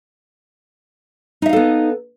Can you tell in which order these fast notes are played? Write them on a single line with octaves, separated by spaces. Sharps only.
D#4 E5 F5 A4 B3